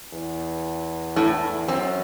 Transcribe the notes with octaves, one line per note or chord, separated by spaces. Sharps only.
E2
A2
F#2 C4